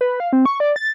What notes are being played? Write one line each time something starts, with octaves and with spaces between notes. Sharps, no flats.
B4
F5
C4
C#6
D5
A6